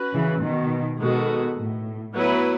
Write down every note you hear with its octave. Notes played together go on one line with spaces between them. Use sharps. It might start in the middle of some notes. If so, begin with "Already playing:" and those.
Already playing: C#4 F#4 B4
C#3 E3
B2 D#3
B2 D#3 G#3 B3 F#4 A4
A2
F#3 B3 E4 B4